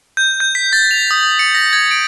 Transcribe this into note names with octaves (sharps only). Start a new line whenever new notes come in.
G6
G6
B6
A6
F7
D#6
D#6
C#7
A#6
G#6
D7